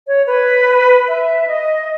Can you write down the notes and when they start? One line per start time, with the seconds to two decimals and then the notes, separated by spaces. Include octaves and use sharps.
0.07 C#5
0.25 B4
1.07 E5
1.47 D#5